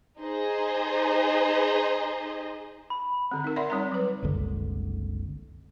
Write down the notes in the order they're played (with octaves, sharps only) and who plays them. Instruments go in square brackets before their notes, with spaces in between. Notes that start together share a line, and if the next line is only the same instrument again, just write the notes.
[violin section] D#4 G#4 C5 D#5
[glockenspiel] B5
[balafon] D3 C4
D#4 A#4
D5 E5 F#5 B5 C6
G3 C4 D#4 D5 A#5
F#3 B4
[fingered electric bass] F#1 C2 D3 G#3